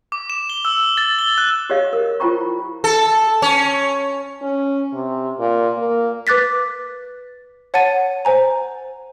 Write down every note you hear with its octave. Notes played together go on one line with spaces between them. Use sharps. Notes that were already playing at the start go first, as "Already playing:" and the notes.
D6
E7
G7
E6
A6
G7
F#6
G4 G#4 C#5 D#5 F5
A#4
E4 F4 C5 G5 A#5 C#6
A4
C#4
C#4
C3
A#2
A#3
B4 D6 F#6 A6 B6
C#5 F#5 A5 A6 D#7
C5 G#5 A#5